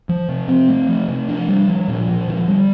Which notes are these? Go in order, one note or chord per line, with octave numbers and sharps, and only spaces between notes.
F3
C3
C4
A3
F3
C3
D4
G3
F3
A#2
F3
D3
G3